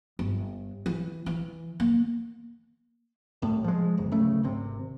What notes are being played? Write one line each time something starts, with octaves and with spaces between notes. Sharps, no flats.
G1
E3
E3
A#3
C2 A2
F3 G#3
D1 G1
D1 C#3 A3
G#1 C3